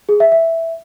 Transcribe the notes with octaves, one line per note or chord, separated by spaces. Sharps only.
G#4
E5
E5